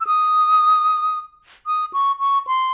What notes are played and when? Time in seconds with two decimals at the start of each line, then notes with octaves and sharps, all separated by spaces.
0.01 E6
0.07 D#6
1.67 D#6
1.93 C#6
2.20 C#6
2.47 C6